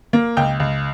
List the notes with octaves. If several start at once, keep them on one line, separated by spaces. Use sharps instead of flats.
A#3
C#2 G5
C#2